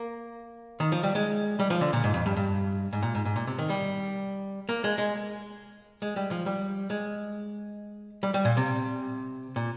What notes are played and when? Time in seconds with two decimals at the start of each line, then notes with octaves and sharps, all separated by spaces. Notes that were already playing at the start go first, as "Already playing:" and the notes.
Already playing: A#3
0.80 D#3
0.92 F3
1.03 G3
1.15 G#3
1.60 G3
1.70 F3
1.81 D3
1.93 A#2
2.04 G#2
2.14 F2
2.26 G2
2.37 G2
2.93 G#2
3.02 A#2
3.15 G#2
3.25 G#2
3.36 A#2
3.47 C3
3.59 D#3
3.69 G3
4.69 A#3
4.84 G#3
4.98 G#3
6.02 G#3
6.16 G3
6.31 F3
6.46 G3
6.90 G#3
8.23 G3
8.34 G3
8.45 A#2
8.57 C3
9.56 A#2